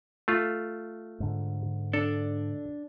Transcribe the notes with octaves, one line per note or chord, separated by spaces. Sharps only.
A3 F4
G#2 D3
D4 A4